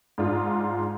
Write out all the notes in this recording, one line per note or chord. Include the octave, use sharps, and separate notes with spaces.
G#2 D4 F4